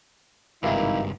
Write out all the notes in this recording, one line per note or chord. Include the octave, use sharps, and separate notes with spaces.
G#1 C#2 G2 C3 E3 A#3 D#4 E4